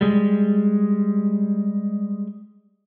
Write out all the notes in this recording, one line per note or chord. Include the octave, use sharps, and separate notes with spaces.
G3 G#3